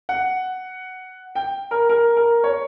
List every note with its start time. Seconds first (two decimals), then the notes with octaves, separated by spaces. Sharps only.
0.09 F#5
1.35 G5
1.71 A#4
1.89 A#4
2.16 A#4
2.44 C#5